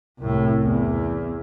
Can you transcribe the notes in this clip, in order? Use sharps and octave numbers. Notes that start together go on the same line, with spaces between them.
C2 A2
E2